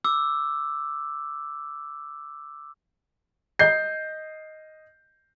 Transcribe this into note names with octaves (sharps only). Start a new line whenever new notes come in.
D6 E6
D#5 G6 C7